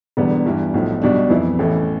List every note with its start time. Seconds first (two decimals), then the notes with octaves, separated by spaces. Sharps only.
0.17 E1 E2 D3 G3 B3
0.45 G2 E3 G3
0.74 B1 A2 F3
1.02 B1 B2 G3 D4
1.30 F2 E3 B3 E4
1.59 A1 A2 E3 A3